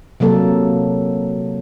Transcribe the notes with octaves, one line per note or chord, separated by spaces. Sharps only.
C3 F#3 A#3 A4